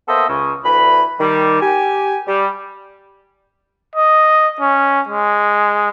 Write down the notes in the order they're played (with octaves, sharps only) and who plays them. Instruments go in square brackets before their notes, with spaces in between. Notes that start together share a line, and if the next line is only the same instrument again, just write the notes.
[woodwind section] A#3 B3 A4 C5 D#5 E5
C#2 C#3
D2 D3 E3 B4 B5
D#3 G3
G4 G#5
G3
[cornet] D#5
C#4
G#3